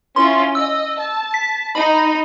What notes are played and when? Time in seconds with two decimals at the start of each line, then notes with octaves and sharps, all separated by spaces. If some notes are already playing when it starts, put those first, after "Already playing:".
0.16 C#4 E4 F4 C6
0.55 D#5 E6
1.00 A5
1.34 B6
1.75 D#4 B5